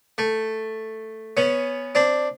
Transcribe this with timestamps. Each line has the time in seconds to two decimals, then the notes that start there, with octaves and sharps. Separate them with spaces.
0.18 A3
1.37 B3 C#4
1.95 C4 D4